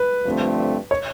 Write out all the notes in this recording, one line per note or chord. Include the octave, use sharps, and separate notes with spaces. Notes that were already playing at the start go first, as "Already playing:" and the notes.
Already playing: B4
G2 D3 F3 A3 C4
C#5